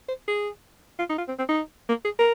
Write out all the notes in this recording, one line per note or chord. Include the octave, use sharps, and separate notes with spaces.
C5
G#4
F4
D#4
F4
C4
C4
D#4
A#3
G#4
A#4